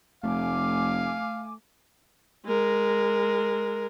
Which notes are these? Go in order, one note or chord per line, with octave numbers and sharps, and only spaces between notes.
F1 A3 F5 G#5 D6
G#3 A#4